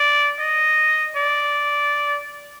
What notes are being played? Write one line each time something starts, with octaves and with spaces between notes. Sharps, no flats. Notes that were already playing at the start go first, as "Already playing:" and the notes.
Already playing: D5
D#5
D5